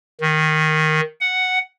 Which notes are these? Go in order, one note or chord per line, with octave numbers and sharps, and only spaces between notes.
D#3
F#5